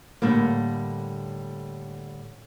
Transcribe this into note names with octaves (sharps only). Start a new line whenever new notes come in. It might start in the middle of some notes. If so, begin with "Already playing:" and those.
A2 D3 G3 A#3